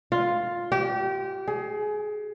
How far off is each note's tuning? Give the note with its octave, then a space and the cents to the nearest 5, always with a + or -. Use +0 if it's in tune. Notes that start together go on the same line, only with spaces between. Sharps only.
F4 +5
G4 -25
G#4 +25